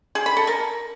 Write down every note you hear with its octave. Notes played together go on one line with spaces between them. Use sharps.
G#4
B5
A4
A#4